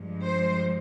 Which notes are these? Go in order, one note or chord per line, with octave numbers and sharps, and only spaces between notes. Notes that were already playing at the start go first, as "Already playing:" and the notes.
Already playing: G2 F3 G#3
C5